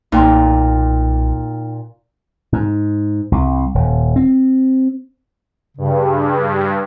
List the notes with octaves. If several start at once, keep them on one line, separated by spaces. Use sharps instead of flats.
B1 A#2 D#4 G5 C6
G#2
C2
D#1
C4
G2 C#3